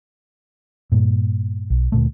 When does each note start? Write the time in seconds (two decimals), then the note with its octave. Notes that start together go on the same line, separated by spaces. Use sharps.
0.92 G2 A#2
1.70 B1
1.92 D2 A#2 A3